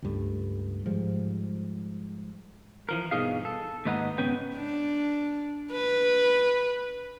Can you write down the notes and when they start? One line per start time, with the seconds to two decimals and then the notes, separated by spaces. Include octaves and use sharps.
0.02 C#2 G2 A3
0.86 G#2 F3 G3
2.89 E3 F3 A#4
3.11 G2 B2 D#4 G#4 F5
3.45 A4
3.85 D#2 G#2 D#4 B4 F#5 A#5
4.18 G#2 C#3 B3 C#4 B4 G5
4.56 D4
5.72 B4